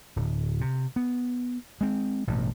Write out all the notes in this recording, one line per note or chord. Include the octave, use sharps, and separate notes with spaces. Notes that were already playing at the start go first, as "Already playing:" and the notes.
D1
C3
B3
G#3 C4
A1 G2 B2